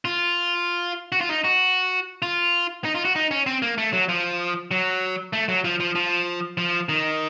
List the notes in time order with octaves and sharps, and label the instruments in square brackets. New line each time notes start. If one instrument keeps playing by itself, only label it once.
[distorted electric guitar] F4
F#4
F4
D#4
F#4
F4
D#4
F4
F#4
D#4
C#4
C4
A#3
A3
F#3
F3
F#3
A3
F#3
F3
F3
F3
F3
D#3